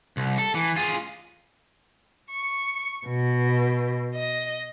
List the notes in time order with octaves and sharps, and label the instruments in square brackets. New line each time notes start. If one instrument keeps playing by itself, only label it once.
[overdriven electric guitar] C2
A4
E3
F4 G#4
[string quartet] C#6
B2
D#5